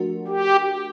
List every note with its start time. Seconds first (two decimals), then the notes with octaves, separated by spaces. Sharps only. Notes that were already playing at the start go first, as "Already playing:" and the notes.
Already playing: F3 A3 D4 F#4 A#4
0.28 G4